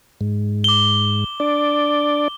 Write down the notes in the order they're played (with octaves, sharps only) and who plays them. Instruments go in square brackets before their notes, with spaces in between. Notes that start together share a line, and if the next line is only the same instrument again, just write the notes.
[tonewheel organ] G#2
[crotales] D6 G7
[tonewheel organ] D4 D5